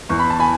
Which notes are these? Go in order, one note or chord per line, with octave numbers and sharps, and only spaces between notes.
E2 C#6
B5
A5
G#5 B5